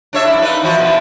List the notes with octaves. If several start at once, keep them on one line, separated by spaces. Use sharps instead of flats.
D4 C#5 E5
F#2 A#3 E4
D#4 B4
E3 F3 F#4
B2 E3 B3